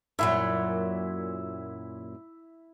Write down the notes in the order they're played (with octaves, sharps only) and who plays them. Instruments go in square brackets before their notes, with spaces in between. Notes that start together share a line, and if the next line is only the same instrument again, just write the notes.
[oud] F#2 A#2 F#3 [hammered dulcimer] E4